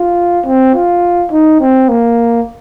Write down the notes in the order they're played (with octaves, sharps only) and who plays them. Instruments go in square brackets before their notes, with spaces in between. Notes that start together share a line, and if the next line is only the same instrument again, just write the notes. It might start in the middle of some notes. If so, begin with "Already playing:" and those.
Already playing: [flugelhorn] F4
C4
F4
D#4
C4
A#3